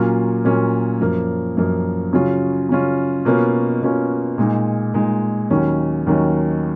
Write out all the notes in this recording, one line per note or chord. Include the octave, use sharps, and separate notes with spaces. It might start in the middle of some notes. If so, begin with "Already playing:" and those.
Already playing: A#2 F#3 A#3 C#4 F4
A#2 F#3 A#3 C#4 F4
F#2 F3 A#3
F#2 F3 A#3
C#3 F#3 C#4 F4
C#3 F#3 C#4 F4
B2 A#3 C#4 F4
B2 A#3 C#4 F4
A#2 G#3 D#4
A#2 G#3 D#4
D#2 D#3 F#3 C#4
D#2 D#3 F#3 C#4